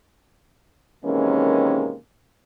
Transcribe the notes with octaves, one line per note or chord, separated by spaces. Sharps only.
C3 D#3 E3 G#3 A#3 C#4